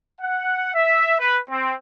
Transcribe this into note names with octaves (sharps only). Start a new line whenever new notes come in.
F#5
E5
B4
C4